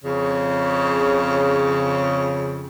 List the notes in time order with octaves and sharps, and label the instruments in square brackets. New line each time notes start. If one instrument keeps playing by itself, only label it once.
[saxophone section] F2 C#3